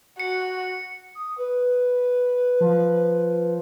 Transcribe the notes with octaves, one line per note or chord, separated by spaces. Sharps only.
F#4 C#7
D#6
B4
F3